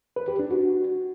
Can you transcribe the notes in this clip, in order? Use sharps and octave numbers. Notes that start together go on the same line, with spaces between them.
B4
G4
D4
F#4